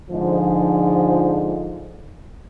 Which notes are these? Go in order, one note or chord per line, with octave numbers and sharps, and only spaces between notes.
G#2 D3 F3